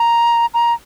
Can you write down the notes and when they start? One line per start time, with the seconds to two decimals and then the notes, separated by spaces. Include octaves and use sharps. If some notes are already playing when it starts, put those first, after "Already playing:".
Already playing: A#5
0.54 A#5